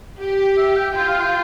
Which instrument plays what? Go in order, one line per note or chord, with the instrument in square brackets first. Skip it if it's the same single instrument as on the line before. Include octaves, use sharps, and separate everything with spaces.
[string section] G4
[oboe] E5
G5
[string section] F4 [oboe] G5
[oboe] F5
G5